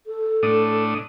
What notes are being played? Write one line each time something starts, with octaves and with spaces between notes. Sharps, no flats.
A4
A2 D4 D#6